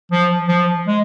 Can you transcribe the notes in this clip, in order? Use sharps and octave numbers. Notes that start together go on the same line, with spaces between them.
F3
F3
G#3